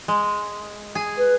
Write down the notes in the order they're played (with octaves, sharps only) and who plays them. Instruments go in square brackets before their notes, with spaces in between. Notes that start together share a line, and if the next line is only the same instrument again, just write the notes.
[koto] G#3
G#4
[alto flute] B4